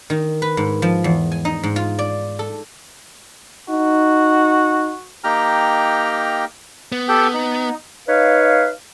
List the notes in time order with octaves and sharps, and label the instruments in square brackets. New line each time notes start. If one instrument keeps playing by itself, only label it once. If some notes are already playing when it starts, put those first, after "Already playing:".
[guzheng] D#3
B4
G#2
F3
E2
G#5
D#4
G#2
F4
D5
A4
[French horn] D#4 [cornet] F#4
[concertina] A#3 D#4 G4 G5 A#5 F6
[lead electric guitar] B3
[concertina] G4 A4 G5
D#4
[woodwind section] D#4 B4 C#5 F5